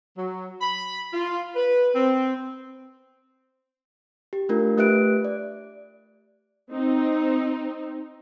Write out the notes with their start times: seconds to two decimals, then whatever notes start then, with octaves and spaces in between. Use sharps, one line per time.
0.16 F#3
0.61 B5
1.13 F4
1.55 B4
1.94 C4
4.33 G4
4.49 A3 D4 F4 A#4
4.77 A3 G4 B4 E5 F#6 D7
5.25 D5
6.71 C4 D#4